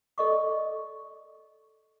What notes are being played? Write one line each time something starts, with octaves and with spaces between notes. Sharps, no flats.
A4 D5 D#5 C#6 D6